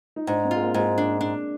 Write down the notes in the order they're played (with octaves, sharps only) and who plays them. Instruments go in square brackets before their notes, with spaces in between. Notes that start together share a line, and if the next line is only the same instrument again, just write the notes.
[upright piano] D#4
[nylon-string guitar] G#2 [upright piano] D4
[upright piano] C4
[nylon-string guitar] F4
[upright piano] G#3
A#3
[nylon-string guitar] G#2
[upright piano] G#3
[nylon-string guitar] D4
D4